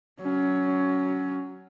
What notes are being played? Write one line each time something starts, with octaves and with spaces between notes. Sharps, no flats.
F#3 C#4